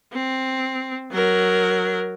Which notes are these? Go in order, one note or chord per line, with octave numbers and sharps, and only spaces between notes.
C4
F#3 A#4